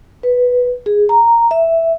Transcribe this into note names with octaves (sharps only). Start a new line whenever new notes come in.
B4
G#4
A#5
E5